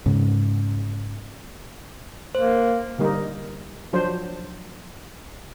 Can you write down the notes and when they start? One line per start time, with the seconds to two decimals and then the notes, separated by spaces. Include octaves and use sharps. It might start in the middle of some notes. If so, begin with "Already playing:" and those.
0.06 G#2 C#3
2.35 A#3 C5
2.99 D3 G3 A#3 D#4
3.93 F3 F#3 D4 C5